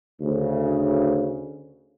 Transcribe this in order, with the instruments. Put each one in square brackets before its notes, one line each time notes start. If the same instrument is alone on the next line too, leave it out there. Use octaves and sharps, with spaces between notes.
[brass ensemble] D2 C#3